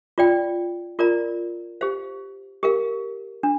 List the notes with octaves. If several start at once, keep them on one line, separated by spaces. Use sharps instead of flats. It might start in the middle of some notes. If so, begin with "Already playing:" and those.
F4 D5 G5
F4 A#4 D5 A#5
G4 C5 F5
G4 A#4 F5
D4